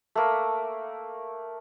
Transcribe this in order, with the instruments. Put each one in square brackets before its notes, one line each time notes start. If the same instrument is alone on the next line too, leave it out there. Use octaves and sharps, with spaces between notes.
[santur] A3 A#3